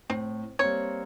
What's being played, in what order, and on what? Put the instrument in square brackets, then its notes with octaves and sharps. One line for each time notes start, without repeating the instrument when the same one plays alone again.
[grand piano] A2 [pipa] C4
[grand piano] G3 A#3 C4 [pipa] C#5